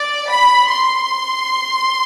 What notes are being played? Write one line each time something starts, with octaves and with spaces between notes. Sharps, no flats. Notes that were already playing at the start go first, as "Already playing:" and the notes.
Already playing: D5
B5
C6